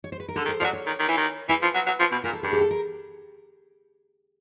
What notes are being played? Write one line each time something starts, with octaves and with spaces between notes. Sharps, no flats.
C#5
C5
B4
A#4
D3 A4
D#3
C5
F3 F#3 D5
C#5
D#3
D#3
E3
D#3
E3 B4
F3
F#3
F#3
F3
B2
A#2 A#4
A4
G2 G#4
G4
A#4
A4
A#4